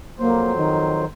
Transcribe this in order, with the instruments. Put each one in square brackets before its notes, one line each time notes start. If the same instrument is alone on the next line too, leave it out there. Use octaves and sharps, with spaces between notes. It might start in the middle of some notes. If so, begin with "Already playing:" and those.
[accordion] F2 F#3 C5 [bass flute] A#3
[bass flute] D#3